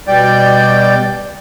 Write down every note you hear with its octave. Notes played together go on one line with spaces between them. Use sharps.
B2 G3 D5 G5